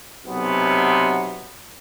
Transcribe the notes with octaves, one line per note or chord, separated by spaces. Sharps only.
B1 C3 B3